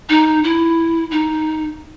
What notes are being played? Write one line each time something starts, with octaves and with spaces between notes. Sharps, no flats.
D#4
E4
D#4